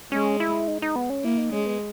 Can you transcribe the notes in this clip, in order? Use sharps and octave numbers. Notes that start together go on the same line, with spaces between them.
G#3 C#4
E4
D#4
D#4
B3
C#4
A#3 E4
D#4
G#3 C#4
B3